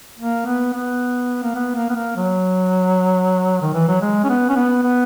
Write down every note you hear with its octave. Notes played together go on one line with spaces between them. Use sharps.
A#3
B3
B3
A#3
B3
A#3
B3
A#3
F#3
D#3
E3
F#3
G#3
C#4
B3
C#4
B3
B3